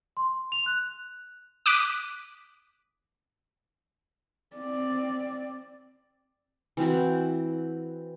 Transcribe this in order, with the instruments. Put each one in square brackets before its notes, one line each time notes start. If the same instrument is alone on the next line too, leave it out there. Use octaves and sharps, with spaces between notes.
[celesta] C6
F7
F#6
[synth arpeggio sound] D6 D#6 F#6 B6 D#7
[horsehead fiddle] C4 D5
[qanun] E3 C4 F#4 B5